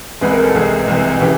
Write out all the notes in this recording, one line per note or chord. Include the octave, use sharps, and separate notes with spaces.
C2 C3 E3 G#3 B4
A#4
A4
C2 C3 E3 G#3 G#4
C2 C3 E3 G#3
C#3 E3 G4